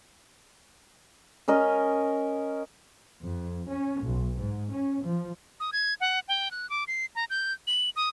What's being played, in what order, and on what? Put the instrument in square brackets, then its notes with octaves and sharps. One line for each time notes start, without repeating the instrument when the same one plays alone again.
[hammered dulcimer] C#4 A#4 D#5
[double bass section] F2
C#4
B1
G#2
C#4
F3
[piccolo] D#6
G#6
F#5
G5
F#6
D6
C7
A#5
G6
F#7
D#6